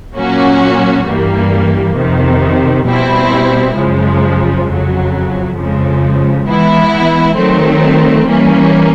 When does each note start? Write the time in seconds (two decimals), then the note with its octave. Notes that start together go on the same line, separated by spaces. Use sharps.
0.16 A#2 F#3 A#3 C#4 F#4
1.06 G2 E3 G3 A#3
1.96 F2 C3 D#3
2.86 B2 G3 C4 E4
3.76 F#2 C#3 F3 G#3
4.66 F2 C#3 F#3
5.56 F2 C#3 F3 G#3
6.45 E3 G#3 B3 E4
7.36 D#3 F#3 A3 C4
8.26 E3 G3 A#3 C#4